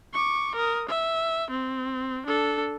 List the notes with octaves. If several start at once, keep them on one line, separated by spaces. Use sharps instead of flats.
C#6 D6
A#4 D#6
E5
C4
D4 A4